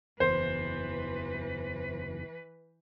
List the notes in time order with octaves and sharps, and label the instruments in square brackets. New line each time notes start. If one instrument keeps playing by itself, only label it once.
[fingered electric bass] F#1 E2 [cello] E3 B4 [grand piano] C5